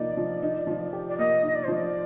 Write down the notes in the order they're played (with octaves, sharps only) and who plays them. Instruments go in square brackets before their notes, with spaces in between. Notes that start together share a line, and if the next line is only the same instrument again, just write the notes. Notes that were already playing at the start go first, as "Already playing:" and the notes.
Already playing: [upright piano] F3 A#3 D#4 [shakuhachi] D5
[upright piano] F3
D#4
F3
G4
[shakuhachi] D5
[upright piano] A#3 [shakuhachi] D#5
[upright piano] D#4
[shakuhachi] D5
C5
[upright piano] F3 [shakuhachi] D5